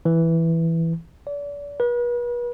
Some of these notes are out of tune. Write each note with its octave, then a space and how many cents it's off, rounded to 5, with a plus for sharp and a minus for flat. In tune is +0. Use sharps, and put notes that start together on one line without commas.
E3 +0
D5 -35
B4 -40